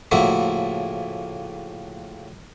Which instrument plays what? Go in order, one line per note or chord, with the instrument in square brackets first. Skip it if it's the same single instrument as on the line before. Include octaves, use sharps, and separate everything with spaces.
[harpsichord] A2 C#3 F3 A#3 E4 F#4